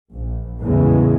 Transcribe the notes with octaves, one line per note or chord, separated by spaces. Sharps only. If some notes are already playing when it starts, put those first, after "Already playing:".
A#1
E2 A2 C#3 G#3